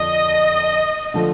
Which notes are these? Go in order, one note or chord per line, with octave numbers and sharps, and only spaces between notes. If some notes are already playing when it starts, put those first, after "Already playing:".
Already playing: F2 D3 F3 D4 D#5
D3 F3 A3